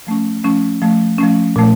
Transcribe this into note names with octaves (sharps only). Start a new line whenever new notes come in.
F3 A3 C#4
F3 A3 C#4
F3 A3 C#4
F3 A3 C#4
A#2 F3 A3